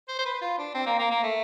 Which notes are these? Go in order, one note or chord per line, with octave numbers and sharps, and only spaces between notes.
C5
C5
B4
F4
D4
C4
A#3
A#3
A#3
A3